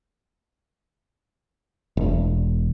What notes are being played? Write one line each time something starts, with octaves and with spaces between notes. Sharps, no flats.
E1